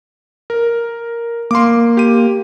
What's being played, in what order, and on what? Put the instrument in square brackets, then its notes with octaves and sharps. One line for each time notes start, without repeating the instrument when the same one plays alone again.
[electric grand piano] A#4
[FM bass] A#3 [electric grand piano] C6 D6
[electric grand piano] G4 D#7